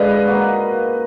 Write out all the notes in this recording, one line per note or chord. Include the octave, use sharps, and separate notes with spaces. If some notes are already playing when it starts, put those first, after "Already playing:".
Already playing: D3 G#3 D4 B4 D#5 F5
A#3 D#4 F#4 B4